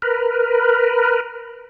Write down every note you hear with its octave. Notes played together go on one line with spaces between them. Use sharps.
A#4 B4